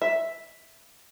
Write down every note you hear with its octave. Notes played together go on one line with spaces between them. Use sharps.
E5